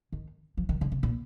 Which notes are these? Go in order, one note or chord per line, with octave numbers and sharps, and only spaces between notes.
D#3
F3
D#3
D3
C3
A#2